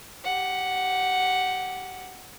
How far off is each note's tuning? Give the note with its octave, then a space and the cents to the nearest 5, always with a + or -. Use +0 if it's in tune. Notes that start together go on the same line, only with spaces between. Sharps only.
G4 -15 F#5 +0